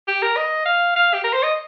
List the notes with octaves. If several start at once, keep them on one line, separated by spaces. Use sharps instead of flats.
G4
A#4
D#5
F5
F5
G4
A#4
C5
D#5